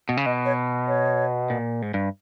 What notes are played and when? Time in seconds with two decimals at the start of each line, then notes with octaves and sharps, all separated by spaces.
0.09 B2
0.17 C#3
0.25 B2 D#5
0.45 C#5
0.88 C#5
1.50 A#2
1.82 G#2
1.94 G2